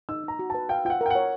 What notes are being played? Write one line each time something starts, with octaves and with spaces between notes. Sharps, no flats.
D#4 E6
D#4 A#5
F#4
B4 A5
F5 G5
F4 F#5 G5
A#4 G5
C#5 F#5